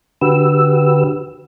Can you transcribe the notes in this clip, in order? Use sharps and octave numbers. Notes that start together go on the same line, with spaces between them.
D3 F#4 G4 B4 E6